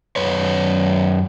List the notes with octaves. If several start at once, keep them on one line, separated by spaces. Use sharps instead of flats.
F#2 B4 C#5